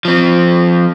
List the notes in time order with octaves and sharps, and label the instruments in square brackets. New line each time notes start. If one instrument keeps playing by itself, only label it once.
[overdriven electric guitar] F3 C4